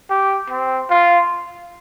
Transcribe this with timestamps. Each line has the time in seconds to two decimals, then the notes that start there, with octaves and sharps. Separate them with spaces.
0.10 G4
0.50 C4
0.90 F4